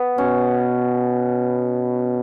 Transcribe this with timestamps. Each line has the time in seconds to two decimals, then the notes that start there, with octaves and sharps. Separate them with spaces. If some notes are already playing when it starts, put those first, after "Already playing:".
Already playing: B3
0.18 B2 C#4